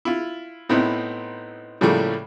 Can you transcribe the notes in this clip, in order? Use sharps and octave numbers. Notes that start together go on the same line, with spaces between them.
E4 F4
A2 B3 C4 D#4 E4
A2 C#3 F3 G3 A3 A#3